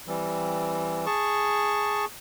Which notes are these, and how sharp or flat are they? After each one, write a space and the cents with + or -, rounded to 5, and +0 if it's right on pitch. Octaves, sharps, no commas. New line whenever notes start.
E3 +10 G3 +0 C4 +0
G#4 +0 A5 +0 C#6 +0